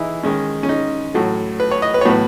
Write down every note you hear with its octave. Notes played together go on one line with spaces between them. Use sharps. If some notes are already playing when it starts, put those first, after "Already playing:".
Already playing: E3 D#4 E4 G#4
D#3 G#3 C#4
C#4
D#4
A2 F#3 A3
B4
C#5
D#5
B4
C#5
A2 F#3 B3 B4